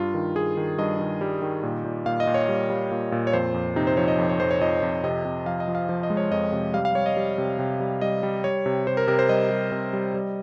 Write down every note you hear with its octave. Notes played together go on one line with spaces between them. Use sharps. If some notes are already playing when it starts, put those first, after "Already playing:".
Already playing: G2 F4
D#3
G2 G#4
D#3
G2 D#5
D#3
G3
D#3
A#2
A#2
A#2 F5
D#5
A#2
C#5
G3
G3
A#2
A#2
C#5
F2 C5
F2
C3 D#4
C5
F3 C#5
D#5
F2
C#5
F2 C5
C#5
F2 D#5
F2
C3 D#5
C3
F3 F5
D#5
F3
F5
F3
D#5
G#3
C#5
F2 D#5
C3
G3 F5
F5
G3 C#5
D#5
G3
C3
C3
G3
G3 D#5
G3
G3 C#5
C3
C3 C5
A#4
C3 A#4
C5
G3 D#5
G3
C3
G3
G3